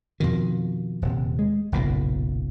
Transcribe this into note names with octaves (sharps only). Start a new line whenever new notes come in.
F2 B2 D#3
D#1 C3
G#3
F#1 B1 A#2 C#3